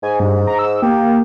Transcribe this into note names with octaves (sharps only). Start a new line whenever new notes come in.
G#2 G#5
G2
A#5
E6
A#3 G4